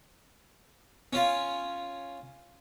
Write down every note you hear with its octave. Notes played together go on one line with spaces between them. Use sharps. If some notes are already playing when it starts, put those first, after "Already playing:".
C#4 F4